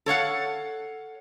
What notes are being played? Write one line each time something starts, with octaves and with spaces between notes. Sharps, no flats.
A4 C#5 F5 F#5